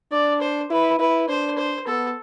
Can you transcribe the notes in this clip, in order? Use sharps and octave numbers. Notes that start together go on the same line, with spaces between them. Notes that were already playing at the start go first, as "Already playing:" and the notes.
D4 D5
C5
E4 B4
E4 B4
D4 C5
C5
B3 A4